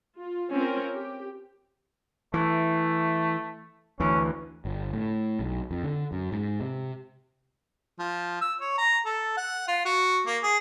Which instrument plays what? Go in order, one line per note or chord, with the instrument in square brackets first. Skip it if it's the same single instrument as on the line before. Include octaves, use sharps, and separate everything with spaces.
[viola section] F4
C4 C#4 F4 A#4
G4
[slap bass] E3 [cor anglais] A3
[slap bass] D2 E3 [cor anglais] C#4
[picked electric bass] G1
A2
B1
F2
D3
F#2
G#2
C3
[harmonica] F3
E6
C#5
A#5
A4
F#5
F4
F#4
A#3
G#4